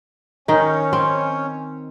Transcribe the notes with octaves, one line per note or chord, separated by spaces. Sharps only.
D#3 C#4 D#4
C4